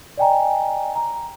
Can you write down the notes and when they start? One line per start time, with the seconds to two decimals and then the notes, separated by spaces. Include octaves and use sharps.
0.18 D5 D#5 G5 G#5 A#5
0.95 A#5